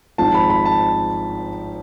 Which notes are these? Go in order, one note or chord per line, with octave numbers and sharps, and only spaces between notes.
G#1 G#2 F3 A5
B5
B5
A5